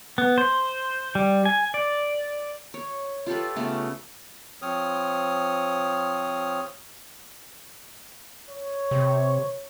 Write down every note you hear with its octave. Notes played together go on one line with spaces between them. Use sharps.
B3
C5
G3
G#5
D5
C#5
F4 G4 A4 B4
C#3 A3 B3 C#4
F3 C4 C#5 D#6 F6
C#5
C3